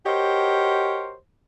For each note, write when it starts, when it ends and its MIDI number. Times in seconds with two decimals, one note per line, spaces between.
0.05 1.14 66
0.05 1.14 67
0.05 1.14 70
0.05 1.14 72
0.05 1.14 73
0.05 1.14 75